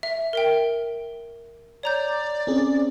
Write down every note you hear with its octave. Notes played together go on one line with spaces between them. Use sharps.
E5
A#4 E5 G5
C#5 D5 A#5 G6
C4 C#4 G#4